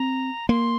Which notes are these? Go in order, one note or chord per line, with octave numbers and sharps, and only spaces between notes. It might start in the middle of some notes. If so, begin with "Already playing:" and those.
Already playing: C4 A#5
A#3 C6